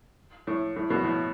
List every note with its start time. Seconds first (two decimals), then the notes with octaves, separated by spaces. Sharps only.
0.47 A2
0.76 A2
0.90 B2
1.04 A2